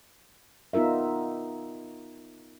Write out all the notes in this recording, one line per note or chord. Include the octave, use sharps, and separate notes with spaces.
B3 D#4 F4 A#4 E5